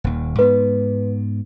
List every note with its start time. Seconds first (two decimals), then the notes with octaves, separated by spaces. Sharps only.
0.04 D#1 D#2
0.39 G#2 B3 B4